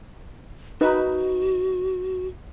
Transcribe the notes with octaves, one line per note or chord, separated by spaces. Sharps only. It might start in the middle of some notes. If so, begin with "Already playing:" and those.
D#4 F#4 B4